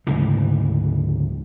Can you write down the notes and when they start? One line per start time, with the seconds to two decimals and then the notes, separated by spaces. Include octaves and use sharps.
0.07 D2 G#2 C#3 E3